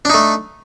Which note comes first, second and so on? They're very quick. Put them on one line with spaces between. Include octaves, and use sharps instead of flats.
D4 D#4 A3